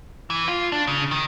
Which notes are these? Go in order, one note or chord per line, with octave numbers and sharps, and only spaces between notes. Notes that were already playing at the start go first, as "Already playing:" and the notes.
E3
F4
D4
C#3
D#3